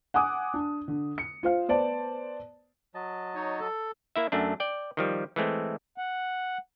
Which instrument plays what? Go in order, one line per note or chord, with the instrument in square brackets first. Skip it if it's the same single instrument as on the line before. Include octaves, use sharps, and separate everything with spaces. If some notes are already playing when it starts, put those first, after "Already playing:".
[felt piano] F#5 G#5 D6 D#6
D4
D3
C#7
F4 C5 F5
B3 C5 D5 A5
[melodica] F#3 D#5 A5
[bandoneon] D#4 C#5
A4
[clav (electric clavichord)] A#3 E4 E5
F#2 A3 D4
D5 G5
D#3 F3 G3
E3 G#3 A3 C4
[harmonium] F#5